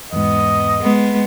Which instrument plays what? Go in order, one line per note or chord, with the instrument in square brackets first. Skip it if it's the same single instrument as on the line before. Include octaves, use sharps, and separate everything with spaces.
[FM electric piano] E2 G#2 [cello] B3 [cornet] D#5
[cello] G#3 B3